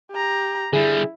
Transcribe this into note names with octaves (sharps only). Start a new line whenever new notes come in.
G4 A#5
D3 G3 E4 G#4